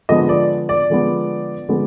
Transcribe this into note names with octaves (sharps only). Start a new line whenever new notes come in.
D3 F3 G#3 B3 D#5
D5
D5
D3 F3 G#3 B3
D3 F3 G#3 B3